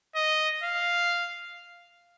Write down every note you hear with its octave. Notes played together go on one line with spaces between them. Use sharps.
D#5
F5